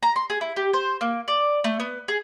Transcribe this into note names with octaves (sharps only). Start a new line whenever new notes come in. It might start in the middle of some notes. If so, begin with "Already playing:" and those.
A#5
C6
G#4
E4
G4
C5
A#3
D5
A3
B3
G#4